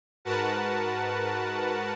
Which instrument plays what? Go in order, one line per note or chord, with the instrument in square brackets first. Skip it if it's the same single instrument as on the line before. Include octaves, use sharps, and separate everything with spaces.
[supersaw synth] G#2 F#4 A#4 B4 F#5 A5